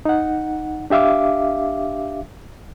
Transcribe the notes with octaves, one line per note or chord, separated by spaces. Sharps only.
D#4 F#5
D4 G4 E5 F5 D6